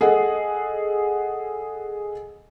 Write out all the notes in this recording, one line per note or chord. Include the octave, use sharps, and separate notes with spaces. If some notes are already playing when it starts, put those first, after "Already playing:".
G#4 A4 D#5 F#5